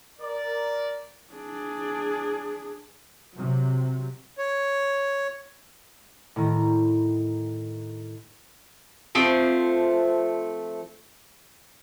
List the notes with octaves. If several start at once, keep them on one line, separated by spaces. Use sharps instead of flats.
A#4 D5
D4 G#4
C3 F#3
C#5
A2 D#3 A#5
F3 A3 C4